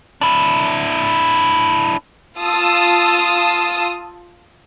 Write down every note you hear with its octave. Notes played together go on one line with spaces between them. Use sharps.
D4 E4
F4 A5 D#6 E6